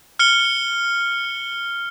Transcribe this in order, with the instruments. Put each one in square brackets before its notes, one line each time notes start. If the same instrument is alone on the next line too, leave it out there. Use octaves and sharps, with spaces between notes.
[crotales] F6 C#7 G7